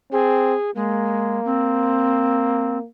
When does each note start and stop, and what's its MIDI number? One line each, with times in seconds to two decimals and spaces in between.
0.12 0.54 60
0.12 0.71 68
0.75 1.40 56
0.75 2.86 58
1.45 2.78 60